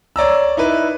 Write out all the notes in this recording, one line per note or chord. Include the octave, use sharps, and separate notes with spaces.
C#5 D5 A#5 E6
D#4 E4 B4